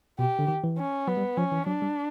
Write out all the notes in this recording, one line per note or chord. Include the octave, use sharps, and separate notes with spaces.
B2 G4
D3
D#3
E3
C#4
F#3 B3
G3
F3 C#4
E3
F#3 D4
G3